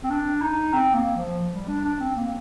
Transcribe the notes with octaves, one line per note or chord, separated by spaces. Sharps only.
C4
D4
D#4
C4
A#3
F3
G3
D4
D4
C4
A#3